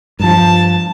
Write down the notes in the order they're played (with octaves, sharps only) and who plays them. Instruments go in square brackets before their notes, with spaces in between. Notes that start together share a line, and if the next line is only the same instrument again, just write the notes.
[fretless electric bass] G2 F3 [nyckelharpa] A5